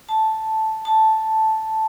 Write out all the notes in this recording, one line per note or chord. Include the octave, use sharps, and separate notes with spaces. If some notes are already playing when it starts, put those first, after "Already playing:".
A5
A5